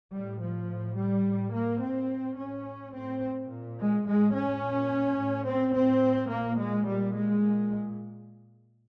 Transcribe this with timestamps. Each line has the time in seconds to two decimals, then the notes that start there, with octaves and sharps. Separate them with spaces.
0.13 A2 G3
0.41 F3
0.69 A2
0.97 G3
1.26 A2
1.54 A#3
1.81 A2 C4
2.38 A2 C#4
2.94 A2 C4
3.49 A#2
3.78 G#3
4.05 A2 G#3
4.33 C#4
4.61 A#2
5.17 A2
5.46 C4
5.73 A2 C4
6.30 A#2 A#3
6.59 G#3
6.86 A#2 G3
7.14 G#3
7.43 A#2